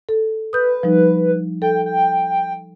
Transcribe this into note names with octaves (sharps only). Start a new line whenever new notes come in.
A4
B4 D#6 G6
F3 G3 D#4
A4 G5
G5